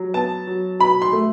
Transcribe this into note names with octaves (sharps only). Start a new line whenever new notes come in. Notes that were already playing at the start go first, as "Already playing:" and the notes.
Already playing: F#3
B3 A5
F#3
B2 B5
C6
A3